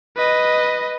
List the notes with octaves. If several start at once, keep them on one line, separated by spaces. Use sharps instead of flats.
B4 D#5